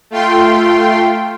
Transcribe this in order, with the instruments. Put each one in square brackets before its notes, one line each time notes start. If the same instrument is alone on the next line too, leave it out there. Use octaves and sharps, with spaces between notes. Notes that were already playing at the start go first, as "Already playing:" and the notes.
[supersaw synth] A3 F4 G5 C6